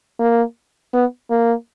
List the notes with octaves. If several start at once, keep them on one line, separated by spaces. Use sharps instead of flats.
A#3
B3
A#3